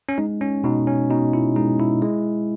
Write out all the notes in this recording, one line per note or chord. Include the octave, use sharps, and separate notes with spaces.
C#4
G#3 D#4
C#4
B2 D#4
C#4
B2 D#4
E4
G#3 D#4
E4
G#3